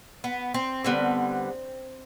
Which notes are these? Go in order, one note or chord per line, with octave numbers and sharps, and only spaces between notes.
B3
C4
D3 G3 B3